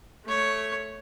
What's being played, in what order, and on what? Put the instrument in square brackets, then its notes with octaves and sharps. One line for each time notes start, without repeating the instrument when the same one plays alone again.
[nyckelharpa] A3 C#5